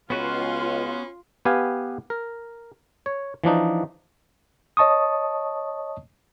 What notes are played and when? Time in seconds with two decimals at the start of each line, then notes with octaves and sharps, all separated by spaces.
0.10 C#2 B3 C#4 F4 F#4 B4 F5 C6
1.45 B3 G4 B4 F5 G#5
2.10 A#4
3.06 C#5
3.44 E3 F3 D4 D#4
4.77 C#5 D#5 A5 C#6 D#6